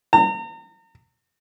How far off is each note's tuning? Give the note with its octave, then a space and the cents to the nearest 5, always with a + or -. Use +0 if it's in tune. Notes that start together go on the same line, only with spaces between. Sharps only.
A#5 -40